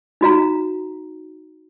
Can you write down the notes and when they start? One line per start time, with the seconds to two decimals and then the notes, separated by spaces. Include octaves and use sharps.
0.21 D#4 F#4 F5 A#5